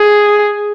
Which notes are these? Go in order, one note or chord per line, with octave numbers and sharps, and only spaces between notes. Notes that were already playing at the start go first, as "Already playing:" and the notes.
Already playing: G#4